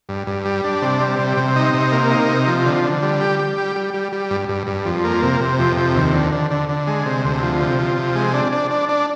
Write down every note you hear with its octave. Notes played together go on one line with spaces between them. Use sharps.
G2
G2
G3
D4
C3
G3
C3
C3
D#4
C3
A#3
D#4
C3
F3
D3
D3
G3
G4
G4
G3
G3
G3
G3
G2
G2
G2
F2
A#3
C3
C3
F2
C3
D#2
D3
D3
D3
D3
G#3
C3
D2
F3
C3
F3
C3
G#3
D4
D4
D4
D4